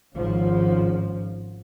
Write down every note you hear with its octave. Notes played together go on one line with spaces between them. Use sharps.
G#1 G#2 C#3 F3